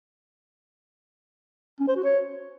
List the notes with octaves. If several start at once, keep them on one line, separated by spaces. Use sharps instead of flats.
C#4
C5
F#4
C#5